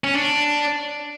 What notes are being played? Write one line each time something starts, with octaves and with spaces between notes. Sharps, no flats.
C#4
D4